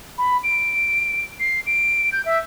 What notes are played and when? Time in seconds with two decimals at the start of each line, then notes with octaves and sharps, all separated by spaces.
0.18 B5
0.44 D7
1.40 C7
1.66 D7
2.12 G6
2.25 E5